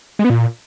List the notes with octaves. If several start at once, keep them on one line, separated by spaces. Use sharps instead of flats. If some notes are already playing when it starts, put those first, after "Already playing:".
G#3
B3
A#2